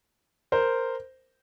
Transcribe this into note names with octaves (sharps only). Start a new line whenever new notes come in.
A#4 C5